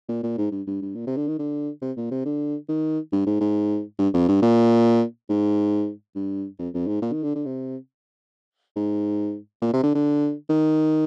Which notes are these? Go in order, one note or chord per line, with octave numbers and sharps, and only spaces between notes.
A#2
A#2
G#2
G2
G2
G2
A#2
C3
D3
D#3
D3
C3
A#2
C3
D3
D#3
G2
G#2
G#2
G2
F2
G2
A#2
G#2
G2
F2
F2
G#2
A#2
D#3
D3
D3
C3
G#2
A#2
C3
D3
D3
D#3